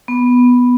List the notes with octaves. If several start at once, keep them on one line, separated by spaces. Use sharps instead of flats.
B3